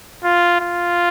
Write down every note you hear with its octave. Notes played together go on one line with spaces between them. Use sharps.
F4
F4